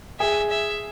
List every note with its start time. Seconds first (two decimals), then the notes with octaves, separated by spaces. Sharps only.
0.19 G#4 E5
0.50 E5